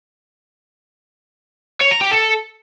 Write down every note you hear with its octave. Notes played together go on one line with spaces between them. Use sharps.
C#5
A#5
G4
A4